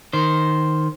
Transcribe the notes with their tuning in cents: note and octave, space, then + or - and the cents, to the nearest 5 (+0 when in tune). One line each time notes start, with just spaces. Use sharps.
D#3 +0 C5 +0